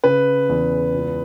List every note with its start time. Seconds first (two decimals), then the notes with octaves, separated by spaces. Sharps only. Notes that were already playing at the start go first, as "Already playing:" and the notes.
0.04 C#3 B4
0.49 E2
0.94 C#2